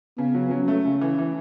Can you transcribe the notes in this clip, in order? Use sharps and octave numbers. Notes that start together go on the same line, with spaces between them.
C#3 B3
F#3
F#3 C#4
A3
C#3
E3
E3